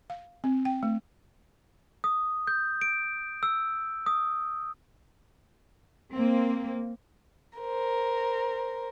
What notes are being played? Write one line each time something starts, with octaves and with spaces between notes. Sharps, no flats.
F5
C4
G5
A3
D#6
G6
D7
E6
D#6
A#3 C4
A#4 C5